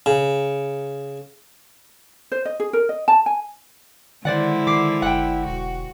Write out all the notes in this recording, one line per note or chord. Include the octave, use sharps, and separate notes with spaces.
C#3
C5
D#5
G#4
A#4
D#5
A5
G#5
D3 D#3 G#3 E4 C5 D5 F#5
D#3 D6 C7
G1 F#5 G5
E1 F#4